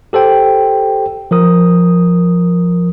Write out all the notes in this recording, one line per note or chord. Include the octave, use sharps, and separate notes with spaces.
G4 A4 C5 G5
F3 A#4 D#6